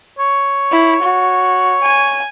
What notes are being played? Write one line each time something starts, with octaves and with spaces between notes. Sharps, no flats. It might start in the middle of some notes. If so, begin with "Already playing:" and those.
C#5
E4
F#4
G#5